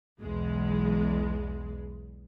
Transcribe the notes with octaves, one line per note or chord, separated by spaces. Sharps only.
B1 E2 G#3